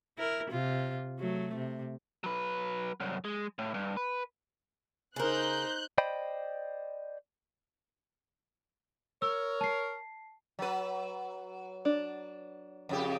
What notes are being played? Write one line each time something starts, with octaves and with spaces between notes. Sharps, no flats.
E4 A#4
C3 F4
F#3 A3
C3
F#3 B4
C2 F#2
G#3
A2
G2
B4
C#3 D#4 A#4 C5 F#6 G6
C5 D5 D#5 G5 B5
A#4 C#5 E6
A5 C7
F#3 B4
D4
F2 C#3 G4